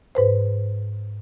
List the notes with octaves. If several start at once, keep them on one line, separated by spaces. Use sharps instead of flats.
G#2 B4 C5